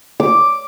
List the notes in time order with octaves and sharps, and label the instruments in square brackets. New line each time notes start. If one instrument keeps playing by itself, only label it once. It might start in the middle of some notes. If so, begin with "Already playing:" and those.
[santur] D6